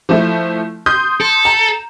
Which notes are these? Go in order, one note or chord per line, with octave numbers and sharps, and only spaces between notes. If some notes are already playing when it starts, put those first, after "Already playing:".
F3 A3 E4
C6 D#6 G6
A4
A#5